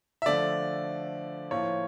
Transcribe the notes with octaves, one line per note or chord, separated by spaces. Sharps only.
E5
D3 F3 A3 D5
A2 F3 A#3 C#5